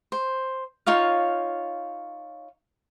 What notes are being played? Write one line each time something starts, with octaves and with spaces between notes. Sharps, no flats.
C5
D#4 F4 C#5 F5